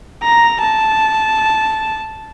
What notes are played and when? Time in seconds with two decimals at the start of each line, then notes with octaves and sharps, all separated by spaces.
0.23 A#5
0.62 A5